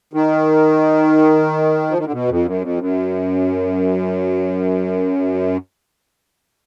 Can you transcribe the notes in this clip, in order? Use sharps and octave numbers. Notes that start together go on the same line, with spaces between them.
D#3
F3
D#3
D3
B2
F2
F#2
F2
F#2